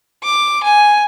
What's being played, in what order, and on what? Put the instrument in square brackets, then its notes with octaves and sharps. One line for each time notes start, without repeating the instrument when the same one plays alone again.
[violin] D6
G#5